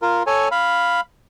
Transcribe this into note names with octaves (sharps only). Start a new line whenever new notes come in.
F4 A#4
A4 C#5 G#5
F5 B5